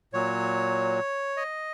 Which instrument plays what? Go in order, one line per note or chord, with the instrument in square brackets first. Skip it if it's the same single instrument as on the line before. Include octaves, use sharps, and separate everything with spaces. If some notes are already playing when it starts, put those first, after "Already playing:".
[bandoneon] A#2 F#3 C#5
D#5